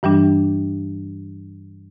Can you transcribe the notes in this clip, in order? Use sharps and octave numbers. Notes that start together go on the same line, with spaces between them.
G2 E3 G3 D4